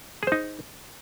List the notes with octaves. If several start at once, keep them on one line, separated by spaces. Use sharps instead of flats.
D#4 G#4 C5